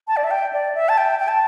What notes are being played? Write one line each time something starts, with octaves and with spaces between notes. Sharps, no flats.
A5
D5
E5
G5
D5
E5
A5
G5
G5
A5